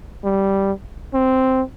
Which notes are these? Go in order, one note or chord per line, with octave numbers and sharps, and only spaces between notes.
G3
C4